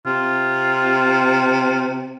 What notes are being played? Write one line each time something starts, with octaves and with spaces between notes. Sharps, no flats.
C3 F4